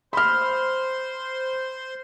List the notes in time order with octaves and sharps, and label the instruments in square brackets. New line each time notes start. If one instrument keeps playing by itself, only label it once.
[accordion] C5 C6 [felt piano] B5 F6